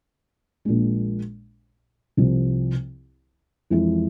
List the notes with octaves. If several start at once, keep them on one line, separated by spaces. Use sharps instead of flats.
A#1 A#2 G#3
C2 C3 F3
F2 E3 G#3 E4